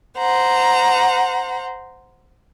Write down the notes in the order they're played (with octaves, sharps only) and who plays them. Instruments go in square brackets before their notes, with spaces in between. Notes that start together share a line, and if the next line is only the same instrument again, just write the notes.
[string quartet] C5 F#5 A#5